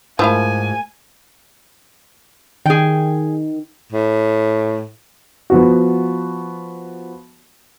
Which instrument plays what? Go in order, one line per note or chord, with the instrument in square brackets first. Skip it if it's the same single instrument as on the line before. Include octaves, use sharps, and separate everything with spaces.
[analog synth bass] G#2 [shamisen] F3 E4 F5 [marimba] A3 A#4 E6 [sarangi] G#5
[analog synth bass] D#3 [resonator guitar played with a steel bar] G#4 G5
[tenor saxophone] A2
[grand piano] F3 B3 F#4